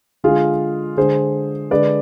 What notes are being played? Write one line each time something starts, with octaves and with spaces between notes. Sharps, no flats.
D3 G#3 F4 G#4
D3 G#3 G#4 C5
D3 G#3 B4 D5